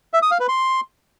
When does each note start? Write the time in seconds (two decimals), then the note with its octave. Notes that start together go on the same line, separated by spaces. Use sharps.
0.14 E5
0.22 D#6
0.31 F5
0.40 B4
0.49 C6